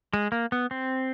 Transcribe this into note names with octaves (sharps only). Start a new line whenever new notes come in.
G#3
A#3
B3
C4